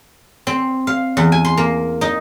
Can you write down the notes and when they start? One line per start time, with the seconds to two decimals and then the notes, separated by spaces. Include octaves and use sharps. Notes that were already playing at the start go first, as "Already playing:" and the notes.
0.47 C4
0.87 F5
1.17 E2
1.32 G#5
1.45 C6
1.57 A#3
2.01 D#4